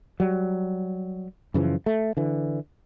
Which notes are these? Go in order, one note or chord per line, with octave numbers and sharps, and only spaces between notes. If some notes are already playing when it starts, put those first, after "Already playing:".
F#3 G3
F#2 C#3 E3 F3
A3
D3 E3